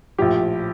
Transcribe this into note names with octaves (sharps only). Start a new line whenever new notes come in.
A#1 A2 F3 G4